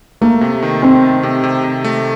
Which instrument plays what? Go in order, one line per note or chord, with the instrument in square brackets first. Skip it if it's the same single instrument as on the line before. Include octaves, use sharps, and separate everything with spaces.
[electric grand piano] A3 [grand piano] A#3
[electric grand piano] C3
D#3
[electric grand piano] D#3 [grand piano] C4
[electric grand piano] A3
C3
C3
C3
A3